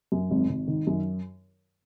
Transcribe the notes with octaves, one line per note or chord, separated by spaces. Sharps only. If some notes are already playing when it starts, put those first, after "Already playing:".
F#2
G#1
G#1
D#3
F#2